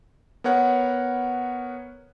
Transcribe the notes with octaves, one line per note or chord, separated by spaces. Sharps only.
B3 A#4 C#5 F#5